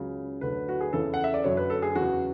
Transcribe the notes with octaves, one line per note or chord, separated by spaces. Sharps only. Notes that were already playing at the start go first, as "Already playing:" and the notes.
Already playing: C#2 C#3 F#3
D2 D3 F#3 B4
F#4
G#4
E2 C#3 E3 A4
F#5
E5
D5
F#2 D3 F#3 C#5
B4
A4
G#4
E2 C#3 F#3 F#4